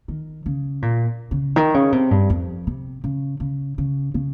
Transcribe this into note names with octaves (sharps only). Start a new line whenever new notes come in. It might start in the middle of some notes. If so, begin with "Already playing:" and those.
D#3
C#3
A#2
C#3
D#3
C#3
C3
G2
F2
C3
C#3
C#3
C#3
C#3